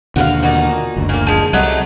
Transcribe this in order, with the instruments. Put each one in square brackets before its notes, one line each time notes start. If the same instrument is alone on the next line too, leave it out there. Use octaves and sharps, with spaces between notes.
[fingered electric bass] D#2 B2 D3 [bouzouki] F#4 G4 F5
[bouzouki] A#2 D#4 F#4
[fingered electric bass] F#1 D2
[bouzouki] A#2 A#3
F3 G#3
[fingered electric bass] C2 [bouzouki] F#3 A3 D#4